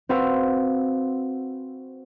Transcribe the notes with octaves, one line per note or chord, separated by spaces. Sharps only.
C4 F#4 B4 F5 E6